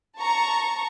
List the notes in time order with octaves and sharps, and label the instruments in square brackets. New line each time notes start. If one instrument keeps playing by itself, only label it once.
[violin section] A5 A#5 C#6